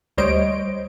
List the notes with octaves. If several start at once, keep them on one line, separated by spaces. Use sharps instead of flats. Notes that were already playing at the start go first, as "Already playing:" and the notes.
D2 G3 C5 C#5 D#5 D7